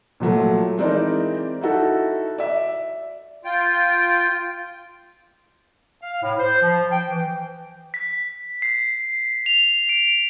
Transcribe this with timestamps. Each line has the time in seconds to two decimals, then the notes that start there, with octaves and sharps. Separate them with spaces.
0.20 A#2 F3 F#3 A3
0.78 E3 G#3 C4 D#4 A#4 D5
1.61 D#4 E4 F#4 A4
2.38 D5 E5
3.45 F4 G5
6.01 F5
6.23 A2
6.39 C5
6.62 F3
6.92 G5
7.09 E3
7.94 B6
8.62 C7
9.46 F7
9.89 D7